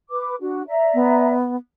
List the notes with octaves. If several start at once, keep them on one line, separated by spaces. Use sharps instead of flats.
B4 D6
D4 F#4
D5 E5 A#5
B3